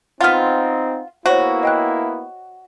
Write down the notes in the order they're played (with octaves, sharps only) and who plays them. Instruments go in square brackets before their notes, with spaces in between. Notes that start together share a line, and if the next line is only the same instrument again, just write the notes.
[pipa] B3 F4 [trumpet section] C4 D#4 [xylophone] F#5 F6
[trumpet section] A#3 B3 E4 [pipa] F#4 [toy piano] C5 C#5
[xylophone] D#5 G5 F#6 [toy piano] F#5